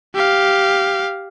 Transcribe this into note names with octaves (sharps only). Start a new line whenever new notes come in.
G4 F5